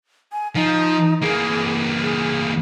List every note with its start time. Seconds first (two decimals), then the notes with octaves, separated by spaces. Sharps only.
0.32 G#5
0.55 F3 D#4
1.22 E3 A#3 G#4
2.02 G#4